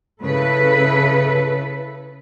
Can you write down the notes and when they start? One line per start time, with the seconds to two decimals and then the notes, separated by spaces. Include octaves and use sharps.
0.24 C#3 E4 A4 B4